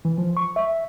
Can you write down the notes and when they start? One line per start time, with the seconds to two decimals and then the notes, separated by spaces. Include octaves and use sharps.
0.05 E3
0.18 F3
0.37 C#6
0.56 E5